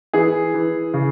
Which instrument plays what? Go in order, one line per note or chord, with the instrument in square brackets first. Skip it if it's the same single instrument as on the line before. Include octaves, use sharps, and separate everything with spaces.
[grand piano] E3 G#4
E3
C#3